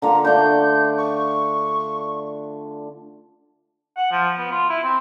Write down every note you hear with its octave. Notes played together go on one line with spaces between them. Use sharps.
D3 A#3 F4 A#5
A3 D4 G6
C#6
F#5
F3
B3
F4
E4
C4